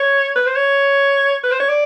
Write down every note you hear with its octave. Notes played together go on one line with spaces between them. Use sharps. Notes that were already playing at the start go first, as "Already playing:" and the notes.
Already playing: C#5
B4
C5
C#5
B4
C5
C#5
D5